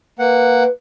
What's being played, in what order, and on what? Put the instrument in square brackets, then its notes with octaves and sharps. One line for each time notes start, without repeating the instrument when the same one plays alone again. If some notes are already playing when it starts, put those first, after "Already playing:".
[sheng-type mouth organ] A#3 F#5 [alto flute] B4